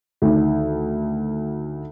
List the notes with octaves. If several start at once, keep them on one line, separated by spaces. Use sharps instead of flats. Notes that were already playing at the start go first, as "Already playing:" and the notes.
D2 D#3